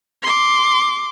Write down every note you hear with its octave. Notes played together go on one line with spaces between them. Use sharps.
C6 D6